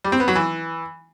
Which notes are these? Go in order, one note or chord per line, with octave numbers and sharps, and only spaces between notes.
G3
C4
B3
F#3
E3